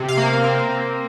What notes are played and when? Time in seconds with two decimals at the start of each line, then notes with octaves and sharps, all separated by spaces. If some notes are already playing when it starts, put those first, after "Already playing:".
Already playing: C3
0.08 F5
0.17 A#3
0.44 C4